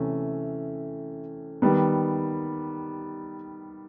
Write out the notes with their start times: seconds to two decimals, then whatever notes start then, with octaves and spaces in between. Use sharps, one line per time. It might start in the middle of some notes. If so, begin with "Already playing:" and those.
Already playing: C3 E3 A3 C#4
1.62 D#3 G3 B3